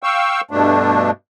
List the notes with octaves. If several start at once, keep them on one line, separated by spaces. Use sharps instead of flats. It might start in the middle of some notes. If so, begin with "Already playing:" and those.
F5 G5 C#6 E6
G2 B2 A3 D4